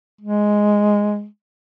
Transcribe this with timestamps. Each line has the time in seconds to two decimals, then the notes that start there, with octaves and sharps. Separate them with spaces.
0.21 G#3